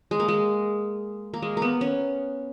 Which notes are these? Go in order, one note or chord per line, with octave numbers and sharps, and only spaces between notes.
G#3
A#3
G#3
A#3
G#3
A#3 B3
C#4